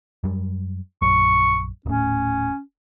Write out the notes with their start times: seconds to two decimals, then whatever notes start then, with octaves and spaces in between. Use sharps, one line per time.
0.24 F#2 G3
1.02 A#1 F#2 C#6
1.86 D#1 A2 C#4